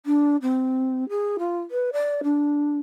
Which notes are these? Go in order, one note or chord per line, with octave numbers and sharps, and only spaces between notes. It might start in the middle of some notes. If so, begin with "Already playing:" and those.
D4
C4
G#4
F4
B4
D5
D4